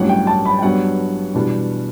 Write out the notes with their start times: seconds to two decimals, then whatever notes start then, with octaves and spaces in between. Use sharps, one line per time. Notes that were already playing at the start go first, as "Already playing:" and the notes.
Already playing: A1 G2 F#3 C#4 F#5
0.09 G5
0.27 A5
0.45 B5
0.58 G5
0.62 G2 F#3 B3 D4 F#5
1.34 E2 B2 G3 B3 D4